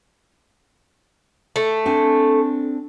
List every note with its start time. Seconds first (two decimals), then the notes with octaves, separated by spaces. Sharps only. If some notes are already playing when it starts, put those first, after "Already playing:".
1.56 A3
1.86 C4 D4 G#5